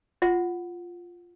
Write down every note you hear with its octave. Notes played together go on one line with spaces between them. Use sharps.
F4 F#5